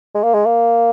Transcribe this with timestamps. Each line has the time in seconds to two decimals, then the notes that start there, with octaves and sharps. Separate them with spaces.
0.15 G#3
0.23 A#3
0.34 G#3
0.46 A#3